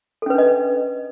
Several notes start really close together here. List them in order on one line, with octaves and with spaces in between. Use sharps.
A4 C#4 B4 D4 D#5